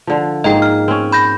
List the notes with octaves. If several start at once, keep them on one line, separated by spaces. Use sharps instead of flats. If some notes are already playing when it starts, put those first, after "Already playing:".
D3 F3
G#2 A#3 D#5 G5
F6
C4 C#4
B5 G6 A#6